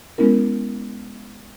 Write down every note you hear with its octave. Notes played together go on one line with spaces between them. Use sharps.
G#3 B3 C#4 E4 A#4